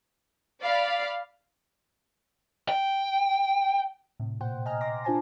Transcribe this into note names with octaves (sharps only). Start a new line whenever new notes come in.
D5 F5 B5
G5
A2 C3
A#2 C5 F#5 G5
D#5 G#5 A#5 F6
C6 D6 A#6
D4 F4 C5 G#5 A5